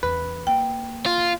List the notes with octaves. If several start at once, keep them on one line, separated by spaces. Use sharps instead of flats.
E2 C#4 B4
A#3 G5
F4